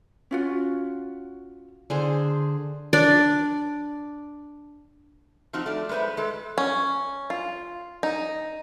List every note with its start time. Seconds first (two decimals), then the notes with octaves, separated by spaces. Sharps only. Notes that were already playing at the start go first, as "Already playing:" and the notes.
0.31 C#4 F4 F#4
1.90 D3 G#4 C5
2.93 D4 D5
5.53 F3 C4 D#4 F#4
5.66 A3 D5
5.89 G#3 B3 B4 C5 E5
6.17 G#3 A4
6.58 C#4
7.30 F4
8.03 D#4